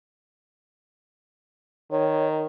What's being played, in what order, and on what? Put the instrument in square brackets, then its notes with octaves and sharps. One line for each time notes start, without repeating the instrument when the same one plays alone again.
[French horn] D#3 [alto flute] C#5